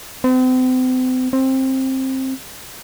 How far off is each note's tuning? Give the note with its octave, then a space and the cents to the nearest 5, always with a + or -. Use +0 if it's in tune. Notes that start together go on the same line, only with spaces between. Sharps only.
C4 -40
C4 +15